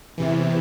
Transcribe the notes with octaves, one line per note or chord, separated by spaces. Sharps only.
E2 C3 E3